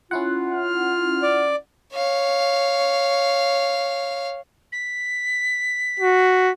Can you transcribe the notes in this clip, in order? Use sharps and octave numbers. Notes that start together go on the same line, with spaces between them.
C#4 E4 F4 F#5
F6
D5
C#5 F5
B6
F#4